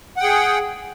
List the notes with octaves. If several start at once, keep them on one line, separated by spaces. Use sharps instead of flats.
G#4 F#5 G5